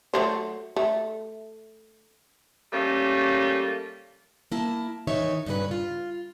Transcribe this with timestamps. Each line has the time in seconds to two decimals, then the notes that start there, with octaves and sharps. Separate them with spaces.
0.14 F#3 A3 C5
0.76 A3
2.72 G3 A3 A#3 C#4
4.52 A#3 E4 A5
5.07 D#3 E3 D#4 C#5 E5
5.46 G2 A#2 C#3 C#4 B4
5.71 F4